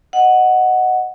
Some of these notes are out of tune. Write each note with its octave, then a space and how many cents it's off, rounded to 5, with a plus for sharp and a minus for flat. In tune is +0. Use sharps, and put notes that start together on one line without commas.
D#5 +0 F#5 +0